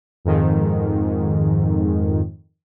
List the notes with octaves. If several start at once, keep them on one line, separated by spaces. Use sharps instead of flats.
F2 G#2 D#3